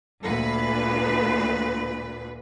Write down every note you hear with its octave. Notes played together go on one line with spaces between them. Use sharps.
D2 A#2 B4